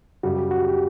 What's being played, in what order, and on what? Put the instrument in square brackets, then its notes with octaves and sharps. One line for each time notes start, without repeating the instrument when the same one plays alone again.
[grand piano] F#2 C#3 G3 [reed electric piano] F#4
[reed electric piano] G4
F#4
G4